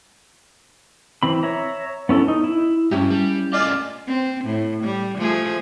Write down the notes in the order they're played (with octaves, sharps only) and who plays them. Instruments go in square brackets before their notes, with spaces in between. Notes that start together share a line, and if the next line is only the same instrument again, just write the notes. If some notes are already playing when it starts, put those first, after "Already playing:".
[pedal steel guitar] E3 C4 B5
C#5 E5 A#5
B3 C#4 E4 A4
D#4
E4
[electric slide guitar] G2 [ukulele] C#4 E4 G4
[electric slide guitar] G3
[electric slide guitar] A3 C#4 D#5 [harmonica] F4 D5
[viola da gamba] C4
A2
G3
F3 A3 G#4